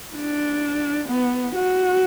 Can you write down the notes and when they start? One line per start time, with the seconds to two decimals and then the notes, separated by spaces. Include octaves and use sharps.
0.16 D4
1.08 B3
1.55 F#4